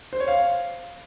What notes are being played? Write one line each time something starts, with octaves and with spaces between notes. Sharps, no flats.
C5
C#5
F5